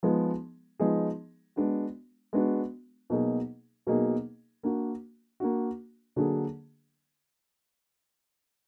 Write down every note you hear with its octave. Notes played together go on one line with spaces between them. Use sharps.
F3 G#3 B3 D#4 G#4
F3 G#3 B3 D#4 G#4
G#3 B3 D4 F#4
G#3 B3 D4 F#4
B2 F#3 A#3 D#4 G#4
B2 F#3 A#3 D#4 G#4
A#3 D4 F#4
A#3 D4 F#4
D3 F#3 A#3 D4 G#4